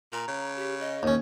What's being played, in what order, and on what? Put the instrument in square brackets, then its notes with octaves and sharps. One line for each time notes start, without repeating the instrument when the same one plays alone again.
[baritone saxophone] A#2 [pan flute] A#5
[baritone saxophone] C#3
[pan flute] G4
D#5
[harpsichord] D#2 C#4